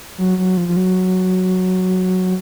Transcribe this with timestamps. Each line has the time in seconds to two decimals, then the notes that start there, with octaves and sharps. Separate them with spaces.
0.18 F#3
0.38 F#3
0.57 F3
0.68 F3
0.77 F#3